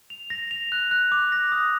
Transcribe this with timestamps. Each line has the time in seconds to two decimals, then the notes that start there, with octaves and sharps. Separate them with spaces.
0.10 F7
0.30 A#6
0.51 F7
0.72 F#6
0.91 F#6
1.12 D6
1.32 A#6
1.52 D#6